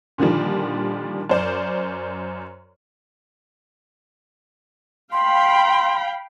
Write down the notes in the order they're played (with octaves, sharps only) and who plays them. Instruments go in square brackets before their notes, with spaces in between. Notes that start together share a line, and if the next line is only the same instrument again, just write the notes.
[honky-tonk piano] A#2 D3 D#3 F3 G3
F#2 C5 D5
[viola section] F5 G5 B5 [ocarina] C6